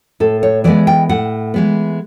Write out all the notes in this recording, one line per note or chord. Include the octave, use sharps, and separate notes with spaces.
A2 A4
C#5
E3 G#3 B3 D5
G5
A2 F#5
E3 G#3 B3